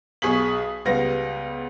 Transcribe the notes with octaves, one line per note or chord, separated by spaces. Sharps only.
B1 G#4 C#6 D#6 B6 F#7
C#2 G3 B3 F5 A#6